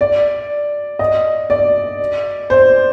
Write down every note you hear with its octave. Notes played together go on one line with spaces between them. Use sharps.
D5
D#5
D5
C5